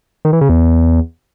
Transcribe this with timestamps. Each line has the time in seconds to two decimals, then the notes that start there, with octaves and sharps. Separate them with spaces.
0.25 D#3
0.33 E3
0.41 C#3
0.49 E2